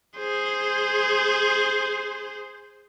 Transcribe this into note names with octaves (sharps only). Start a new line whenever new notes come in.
G#4 C5